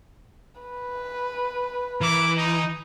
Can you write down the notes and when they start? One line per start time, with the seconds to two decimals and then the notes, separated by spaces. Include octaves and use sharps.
0.60 B4
2.01 E3 E4 A#4 D6
2.37 D#4